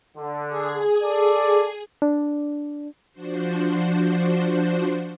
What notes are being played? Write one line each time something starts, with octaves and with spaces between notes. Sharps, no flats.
D3
G#4
A4 D5
D4
F3 D4 F#4 C5